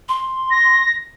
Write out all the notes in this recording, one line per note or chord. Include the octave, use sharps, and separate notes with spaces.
C6
A#6